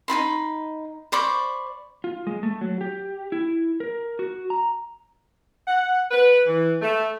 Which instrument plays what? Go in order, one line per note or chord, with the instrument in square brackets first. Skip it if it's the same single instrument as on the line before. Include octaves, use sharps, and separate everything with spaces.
[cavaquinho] D#4 F4 B5 C6
C5 D5 B5 C#6
[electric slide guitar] F4
G#3
A3
F#3
G4
E4
A#4
F#4
A#5
[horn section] F#5
B4
E3
A3